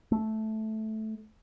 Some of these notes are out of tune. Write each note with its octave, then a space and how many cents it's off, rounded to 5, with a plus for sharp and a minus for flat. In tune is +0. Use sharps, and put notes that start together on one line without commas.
A3 -10